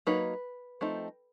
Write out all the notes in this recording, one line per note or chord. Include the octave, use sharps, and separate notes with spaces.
F#3 A#3 D#4 B4
F3 A3 C4 D#4